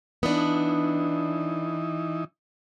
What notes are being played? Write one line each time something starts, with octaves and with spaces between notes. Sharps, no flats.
E3 B3 D4 D#4